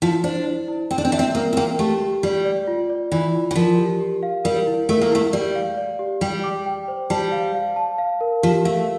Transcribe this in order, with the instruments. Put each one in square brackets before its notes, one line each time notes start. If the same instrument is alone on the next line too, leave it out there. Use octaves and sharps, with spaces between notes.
[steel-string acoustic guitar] F3 [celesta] E4
[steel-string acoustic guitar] D4 [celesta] C5
[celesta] E4
E4
[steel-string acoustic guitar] C4 [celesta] G5
[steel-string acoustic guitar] D4
C4
[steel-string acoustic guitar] D4 [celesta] E5
[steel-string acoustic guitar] C4
[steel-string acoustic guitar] A#3 [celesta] A#4
[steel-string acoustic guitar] C4
[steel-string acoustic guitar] A#3 [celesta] G5
[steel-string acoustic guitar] A3 [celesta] G4
[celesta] G4
[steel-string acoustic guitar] G3 [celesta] D5
[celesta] D5
F4
D5
[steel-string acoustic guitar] E3 [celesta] D5
[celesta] F4
[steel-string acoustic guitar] E3
[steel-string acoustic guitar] F3 [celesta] A#4
[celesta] G4
G4
F5
[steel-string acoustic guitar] G3 [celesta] A#4
[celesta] E4
[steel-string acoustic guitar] A3 [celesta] A#4
[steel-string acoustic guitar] A#3
[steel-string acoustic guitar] A3 [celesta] E4
[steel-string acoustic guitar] G3 [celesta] D5
[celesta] F5
D5
G4
[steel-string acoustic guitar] G3 [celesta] G5
[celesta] D6
G5
C5
[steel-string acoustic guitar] G3 [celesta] A5
[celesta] F5
F5
A5
F5
A#4
[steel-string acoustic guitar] F3 [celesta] G4
[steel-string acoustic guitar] A3 [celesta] F5